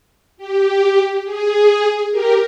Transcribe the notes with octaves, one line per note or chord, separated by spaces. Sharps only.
G4
G#4
G4 A#4